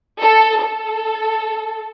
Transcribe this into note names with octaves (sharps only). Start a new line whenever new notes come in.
A4
A4